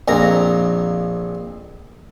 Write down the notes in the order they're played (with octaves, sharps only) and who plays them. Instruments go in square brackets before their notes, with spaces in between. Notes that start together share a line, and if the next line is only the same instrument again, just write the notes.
[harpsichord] A#1 F2 A#5